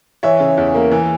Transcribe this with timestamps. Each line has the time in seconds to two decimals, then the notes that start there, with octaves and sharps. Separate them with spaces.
0.23 E3 C#5 E5
0.40 C#3
0.57 E2
0.75 A#3
0.91 E3